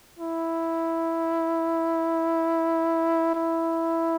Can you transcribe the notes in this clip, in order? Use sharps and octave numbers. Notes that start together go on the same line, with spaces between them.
E4
E4